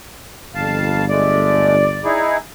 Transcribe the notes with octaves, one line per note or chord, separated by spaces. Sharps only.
G1 F2 F5 A5
G#3 A3 D5
D#4 E4 G#4